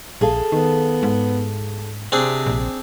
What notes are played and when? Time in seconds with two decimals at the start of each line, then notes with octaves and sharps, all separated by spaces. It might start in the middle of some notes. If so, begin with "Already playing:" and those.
0.21 A#1 G#4 A4 F5
0.52 D#3 B3
1.03 G#2
2.12 C3 C4 D4 G#4
2.46 A#1